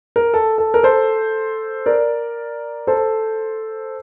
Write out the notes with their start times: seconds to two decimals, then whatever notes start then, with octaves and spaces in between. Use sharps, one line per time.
0.16 A#4
0.34 A4
0.58 A4
0.74 A#4
0.83 A4 C5
1.86 A#4 D5
2.87 A4 C5